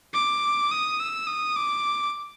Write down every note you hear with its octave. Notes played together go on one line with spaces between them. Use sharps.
D6
D#6
E6
D#6
D6